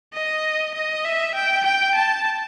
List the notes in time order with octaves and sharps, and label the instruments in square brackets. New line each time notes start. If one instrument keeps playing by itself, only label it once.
[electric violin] D#5
D#5
E5
G5
G5
A5